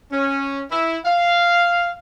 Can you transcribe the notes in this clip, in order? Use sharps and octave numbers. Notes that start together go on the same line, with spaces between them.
C#4
E4
F5